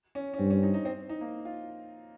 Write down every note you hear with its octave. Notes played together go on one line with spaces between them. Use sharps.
C#4
C#4
G2 C4
C#4
D#4
D#4
C4
D#4
A#3
F4